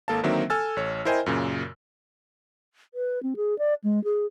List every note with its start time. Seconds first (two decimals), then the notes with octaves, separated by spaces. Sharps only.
0.08 G#1 A#3 A4 F5 A5
0.23 D3 D#3 F#3 A#3 C4 E5
0.50 A4 G#5 E6 F6 A6
0.76 A1 C#5
1.05 E4 A#4 C5 D#5 G5 G#5
1.26 F#2 A#2 C#3
2.94 B4
3.23 C4
3.36 G#4
3.59 D5
3.84 G#3
4.04 G#4